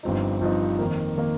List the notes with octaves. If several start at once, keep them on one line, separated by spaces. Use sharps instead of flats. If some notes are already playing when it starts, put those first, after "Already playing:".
G1 G2 F3 C4 D#4
G1 G2 F3 C4 D#4
F2 D#3 A#3
D#3 A#3